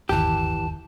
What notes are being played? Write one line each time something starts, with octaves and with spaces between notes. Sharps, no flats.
D1 G1 D#2 E3 G4 A5